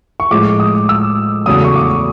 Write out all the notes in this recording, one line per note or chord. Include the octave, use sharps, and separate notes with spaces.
C#6
A2 F3 G#3 D6
D#6
E6
E2 C#3 F#3 A3 D#6
C#6
D6